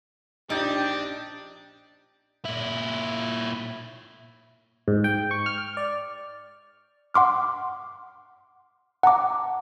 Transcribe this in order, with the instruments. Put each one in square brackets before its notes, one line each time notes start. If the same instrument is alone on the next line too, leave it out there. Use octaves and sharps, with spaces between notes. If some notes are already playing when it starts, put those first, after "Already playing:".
[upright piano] A#1 G6 [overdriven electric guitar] D4 [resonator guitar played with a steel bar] D#4 [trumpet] G4
[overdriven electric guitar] A#2 E4
[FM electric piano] G#2
G5
C#6
F6
F6
D5
[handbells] F#5 C6 D6 F6
F#5 A5 A#5 D6